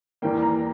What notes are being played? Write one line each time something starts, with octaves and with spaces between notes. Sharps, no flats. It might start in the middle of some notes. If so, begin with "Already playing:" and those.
E2 E3 G3 A#3 G5
A#5